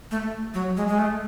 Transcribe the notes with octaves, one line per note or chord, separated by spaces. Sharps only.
A3
F#3
G#3
G#3
A3